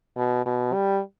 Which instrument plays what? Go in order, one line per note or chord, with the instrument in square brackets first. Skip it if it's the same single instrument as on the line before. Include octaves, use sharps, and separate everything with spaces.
[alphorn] B2
B2
G3